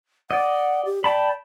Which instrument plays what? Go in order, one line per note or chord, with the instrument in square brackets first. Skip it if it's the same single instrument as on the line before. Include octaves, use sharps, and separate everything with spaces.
[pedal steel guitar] D5 D#5 [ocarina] F#5
[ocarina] G4
[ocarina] D5 [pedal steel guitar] G5 A5 B5